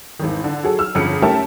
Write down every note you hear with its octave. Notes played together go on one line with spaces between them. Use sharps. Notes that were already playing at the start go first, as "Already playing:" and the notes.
G#1 E2 D#3
D3
F#3 G#4 A4
E6 F6
G1 F2 C#3 C#7
A3 C#4 G4 A#4 E5 A5